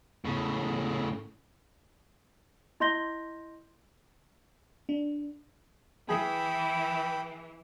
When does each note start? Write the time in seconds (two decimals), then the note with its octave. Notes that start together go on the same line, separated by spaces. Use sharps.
0.25 A2 C#3
2.80 E4 D#5 C6 G6 A#6 G7
4.89 D4
6.09 E3 G#4 G5 B5